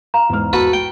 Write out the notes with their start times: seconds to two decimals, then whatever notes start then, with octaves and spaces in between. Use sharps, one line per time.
0.14 F5 A#5
0.29 E2 G#2 F6
0.53 F#4 A4 B4
0.73 G5